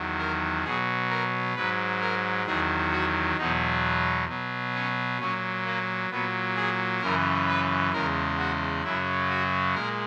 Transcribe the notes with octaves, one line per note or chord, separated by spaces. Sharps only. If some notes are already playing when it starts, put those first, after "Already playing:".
Already playing: E2 D#3 F#3
A#4
B2 F#3 G#4
A#4
G#2 F#3 B4
A#4
E2 D#3 F#3 G#4
F#4
E2 B2 F#3 D#4
B2 F#3
C#4
A#2 F#3 C#4
A#3
A#2 F#3 B3
G#4
F#2 C#3 E3 A#4
B4
E2 C#3 G#3 A#4
F#4
F#2 C#3 F#3 E4
F#4
A#2 G#3 A#4